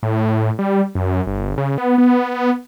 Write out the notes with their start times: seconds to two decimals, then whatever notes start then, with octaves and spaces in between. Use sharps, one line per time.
0.03 A2
0.59 G3
0.95 F#2
1.27 G1
1.58 C#3
1.78 B3
1.98 B3